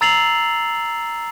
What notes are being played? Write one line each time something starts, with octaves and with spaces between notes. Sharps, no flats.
A#5 E6 A6 C7 F7 F#7